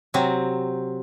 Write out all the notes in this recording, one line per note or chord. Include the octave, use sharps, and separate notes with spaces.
C3 F#3 C4